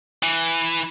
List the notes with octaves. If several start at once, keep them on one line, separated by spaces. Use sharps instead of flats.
E3